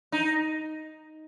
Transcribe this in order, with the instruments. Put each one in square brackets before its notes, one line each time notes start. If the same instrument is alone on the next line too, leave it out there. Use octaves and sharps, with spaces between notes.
[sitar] D#4